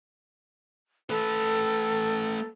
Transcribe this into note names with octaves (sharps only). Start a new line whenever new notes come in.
A3 A4 B4